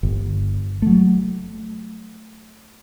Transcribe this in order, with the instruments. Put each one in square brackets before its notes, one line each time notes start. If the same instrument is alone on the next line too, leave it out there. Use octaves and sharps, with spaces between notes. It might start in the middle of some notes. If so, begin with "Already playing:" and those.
[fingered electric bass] G1
F#3 A3